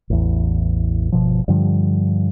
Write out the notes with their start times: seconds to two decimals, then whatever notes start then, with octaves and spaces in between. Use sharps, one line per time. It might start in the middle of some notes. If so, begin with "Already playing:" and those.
0.10 A1 E2
1.12 G1 B2 F3
1.48 G2 D3 F3 G3